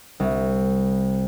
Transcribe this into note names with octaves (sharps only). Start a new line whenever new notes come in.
C2